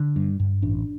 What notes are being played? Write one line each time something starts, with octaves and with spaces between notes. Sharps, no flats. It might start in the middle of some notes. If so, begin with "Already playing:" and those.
Already playing: D3
G2
G2
A1 D4